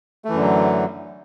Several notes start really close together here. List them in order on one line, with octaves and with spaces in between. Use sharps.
A3 E3 F#2 D3 F#3